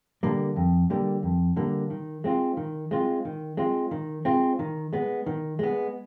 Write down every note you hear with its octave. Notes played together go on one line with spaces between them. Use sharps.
D3 G3 A#3
F2
D3 G3 A#3
F2
D3 G3 A#3
D#3
G#3 C4 F4
D#3
G#3 C4 F4
D#3
G#3 C4 F4
D#3
G#3 C4 F4
D#3
G#3 B3
D#3
G#3 B3